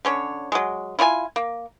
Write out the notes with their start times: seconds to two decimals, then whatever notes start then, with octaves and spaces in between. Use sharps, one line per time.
0.05 D3 C#4 C#5
0.52 F#3 G#3
0.99 E4 F4 C#5 G#5
1.36 A#3